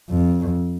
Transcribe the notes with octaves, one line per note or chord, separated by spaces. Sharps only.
F2